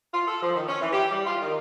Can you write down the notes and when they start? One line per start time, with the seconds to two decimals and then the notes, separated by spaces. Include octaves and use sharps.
0.13 F4
0.27 A4
0.42 F3
0.54 D#3
0.68 C#4
0.81 E3
0.93 G4
1.11 G3
1.25 F4
1.41 D#3